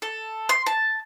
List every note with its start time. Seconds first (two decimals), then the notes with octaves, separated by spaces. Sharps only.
0.02 A4
0.49 C6
0.66 A5